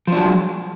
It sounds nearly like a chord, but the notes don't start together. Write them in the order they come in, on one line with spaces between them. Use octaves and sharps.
F3 D4 F#3 G#3